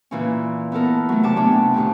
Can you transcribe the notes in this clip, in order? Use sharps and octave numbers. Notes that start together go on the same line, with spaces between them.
A#2 E3 C#4
B3 E4 A4 A#4
F#3 A3
C3 C#5 A5 D6
C3 B3 C#4 D4
F2 A2 C3 D#3